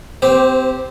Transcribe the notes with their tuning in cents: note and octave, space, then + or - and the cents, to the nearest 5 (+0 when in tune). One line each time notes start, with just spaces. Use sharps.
C4 -25 G4 +0 C5 +5